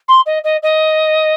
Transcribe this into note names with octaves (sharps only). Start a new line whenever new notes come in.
C6
D#5
D#5
D#5